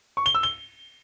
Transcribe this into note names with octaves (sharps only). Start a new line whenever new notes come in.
C#6
G7
E6
G7